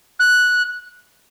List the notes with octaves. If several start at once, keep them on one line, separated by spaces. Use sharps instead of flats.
F#6